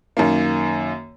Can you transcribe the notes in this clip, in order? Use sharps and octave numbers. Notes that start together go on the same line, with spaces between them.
F#2 D#3 A#3